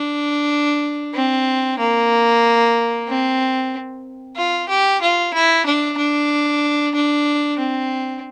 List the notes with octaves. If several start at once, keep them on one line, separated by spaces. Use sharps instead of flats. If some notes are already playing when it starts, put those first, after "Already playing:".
Already playing: D4
C4
A#3
C4
F4
G4
F4
E4
D4
D4
D4
C4